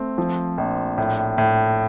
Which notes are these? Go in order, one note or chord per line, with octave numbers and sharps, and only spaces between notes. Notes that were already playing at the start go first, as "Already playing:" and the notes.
Already playing: A3 C4
F3
A#1
A2
A2